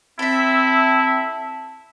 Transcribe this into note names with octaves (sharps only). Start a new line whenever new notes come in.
C4 E4 A4 E5